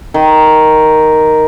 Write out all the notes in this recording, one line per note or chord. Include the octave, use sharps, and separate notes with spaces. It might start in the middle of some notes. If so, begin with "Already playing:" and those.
D#3